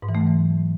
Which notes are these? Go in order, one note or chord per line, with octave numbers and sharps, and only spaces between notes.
G#2
E3
A3
F#3
E3